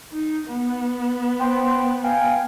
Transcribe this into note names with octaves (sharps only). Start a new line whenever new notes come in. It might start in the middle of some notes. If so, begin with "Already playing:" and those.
D#4
B3
C5 G5
F5 G5 G#5